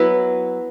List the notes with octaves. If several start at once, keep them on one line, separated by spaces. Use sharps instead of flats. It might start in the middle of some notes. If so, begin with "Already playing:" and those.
Already playing: F#3 B3 E4 B4